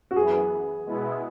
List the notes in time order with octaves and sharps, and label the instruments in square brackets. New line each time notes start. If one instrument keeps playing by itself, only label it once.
[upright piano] F#4
[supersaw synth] F#2 E3 B3 [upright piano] G#4
[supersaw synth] B2 G#3 B3 E4